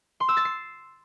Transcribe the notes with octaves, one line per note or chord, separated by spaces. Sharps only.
C6
E6
A6
C7